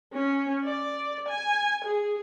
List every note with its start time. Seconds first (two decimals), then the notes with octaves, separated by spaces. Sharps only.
0.14 C#4
0.64 D5
1.29 G#5
1.85 G#4